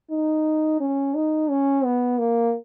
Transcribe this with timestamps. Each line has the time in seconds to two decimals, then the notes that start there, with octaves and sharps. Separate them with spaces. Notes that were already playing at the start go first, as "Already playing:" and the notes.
0.11 D#4
0.81 C#4
1.15 D#4
1.50 C#4
1.85 B3
2.19 A#3